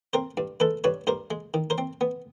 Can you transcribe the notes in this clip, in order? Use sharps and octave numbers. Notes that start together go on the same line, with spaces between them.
C4 A#4 C5
G2
G#3 A4 B4
G2 B4 C#5
G2 A#4 C5
G#3
D#3
A#4 C5
C4
B3